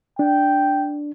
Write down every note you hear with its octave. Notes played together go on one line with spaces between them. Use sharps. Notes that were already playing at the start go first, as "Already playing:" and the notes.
D4 G5